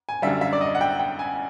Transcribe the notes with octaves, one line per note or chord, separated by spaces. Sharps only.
G#5
F#2 D3 G3 E5
E5
D5
D#5
F#5
G5
G5
G#5